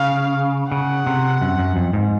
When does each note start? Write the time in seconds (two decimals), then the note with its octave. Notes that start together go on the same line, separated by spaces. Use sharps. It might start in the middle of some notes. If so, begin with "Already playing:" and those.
Already playing: C#3 F5
0.72 C#3 F#5
1.06 C3
1.41 F#2
1.59 F#2
1.76 F2
1.93 G#2